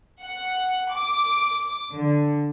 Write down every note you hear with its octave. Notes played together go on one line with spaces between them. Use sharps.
F#5
D6
D3